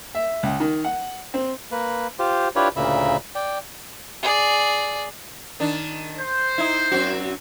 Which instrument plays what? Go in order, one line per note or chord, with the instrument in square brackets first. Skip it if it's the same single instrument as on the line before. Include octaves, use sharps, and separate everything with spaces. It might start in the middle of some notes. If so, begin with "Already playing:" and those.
[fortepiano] E5
C#2
D#3
F#5
C4
[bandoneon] A#3 B4
F4 G4 C5
D4 E4 F4 G4 B4 C#5
D2 A#2 C#3 A#3 E5 B5
D5 G5
[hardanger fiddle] G#4 D5
[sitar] D#3 D4
[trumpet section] C5
[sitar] D#4 E4
F#2 C4 F#4